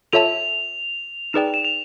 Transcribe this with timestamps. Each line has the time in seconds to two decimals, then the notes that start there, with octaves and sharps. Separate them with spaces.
0.13 F4 A4 C#5 E5 A5 F7
1.33 D#4 G#4 B4 D5 G5 E7
1.54 E7
1.65 F7